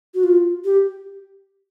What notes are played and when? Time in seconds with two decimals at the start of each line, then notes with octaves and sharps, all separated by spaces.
0.14 F#4
0.24 F4
0.65 G4